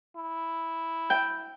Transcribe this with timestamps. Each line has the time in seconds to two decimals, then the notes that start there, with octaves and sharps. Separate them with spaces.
0.16 E4
1.10 G5